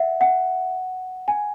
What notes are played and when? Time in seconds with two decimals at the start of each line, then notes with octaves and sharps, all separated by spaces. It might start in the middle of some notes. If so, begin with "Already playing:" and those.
Already playing: E5 F#5
0.21 F#5
1.28 G#5